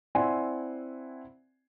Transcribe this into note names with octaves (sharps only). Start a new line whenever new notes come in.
C4 E4 D5 F#5 G#5 C6